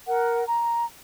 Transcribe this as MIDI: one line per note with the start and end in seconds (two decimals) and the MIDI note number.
0.07 0.43 70
0.07 0.43 78
0.46 0.84 82